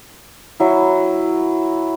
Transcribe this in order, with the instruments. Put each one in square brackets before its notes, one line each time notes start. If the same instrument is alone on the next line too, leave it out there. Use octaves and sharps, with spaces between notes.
[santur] F#3 E4